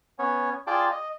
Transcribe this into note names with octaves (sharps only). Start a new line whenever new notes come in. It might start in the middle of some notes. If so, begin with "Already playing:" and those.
B3 C#4 C#5
F4 G#4 D5 G5 A5
D#5